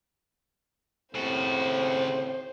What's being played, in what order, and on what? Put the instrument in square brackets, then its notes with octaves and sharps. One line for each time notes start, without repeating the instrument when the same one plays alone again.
[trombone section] D#2 A2 C4 [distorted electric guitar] C#3 F#4 [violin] C5